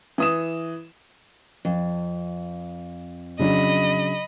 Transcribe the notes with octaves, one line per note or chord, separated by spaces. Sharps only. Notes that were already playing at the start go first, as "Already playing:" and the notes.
E3 D#6 E7
F2
C#3 F#3 D4 D#5 B5